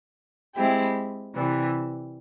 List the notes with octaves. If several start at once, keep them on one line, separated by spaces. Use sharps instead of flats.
G#3 C4 E4 G4
C3 E3 G3